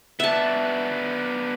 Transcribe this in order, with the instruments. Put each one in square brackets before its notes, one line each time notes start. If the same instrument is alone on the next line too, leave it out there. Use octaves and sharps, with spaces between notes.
[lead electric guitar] B3 D4 [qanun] E5 A5